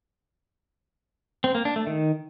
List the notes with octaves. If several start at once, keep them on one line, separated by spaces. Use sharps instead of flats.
C4
A#3
D4
A3
D#3